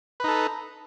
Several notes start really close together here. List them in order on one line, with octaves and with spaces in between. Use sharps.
B4 D#4 A4